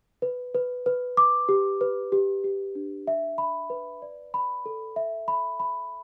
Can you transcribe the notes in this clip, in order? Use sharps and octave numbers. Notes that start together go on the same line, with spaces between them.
B4
B4
B4
D6
G4
B4
G4
G4
D4
E5
B5
B4
D5
B5
A4
E5
B5
B5